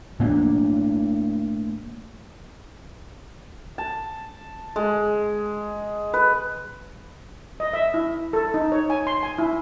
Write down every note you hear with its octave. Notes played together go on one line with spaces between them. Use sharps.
A2 A#3 D4
A5
G#3
B4
D#5
E5
E4
A4
D#4
C#5
G#5
C6
G#5
E4